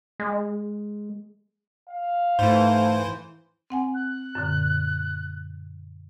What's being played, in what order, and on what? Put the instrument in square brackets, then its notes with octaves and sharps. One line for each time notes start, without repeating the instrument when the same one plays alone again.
[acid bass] G#3
[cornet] F5
[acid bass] G#2 [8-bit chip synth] E3 C5 [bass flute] A3
[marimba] C4 F#5 G#5
[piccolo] F#6
[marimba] F#2 A#2 D3